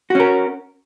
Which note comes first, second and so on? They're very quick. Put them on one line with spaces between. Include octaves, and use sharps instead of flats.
F#4 C#4 A#4